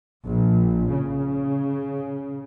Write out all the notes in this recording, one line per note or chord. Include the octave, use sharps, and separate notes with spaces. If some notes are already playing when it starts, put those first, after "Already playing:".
A#1
C#3